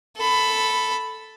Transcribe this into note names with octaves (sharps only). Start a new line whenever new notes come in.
A4 B5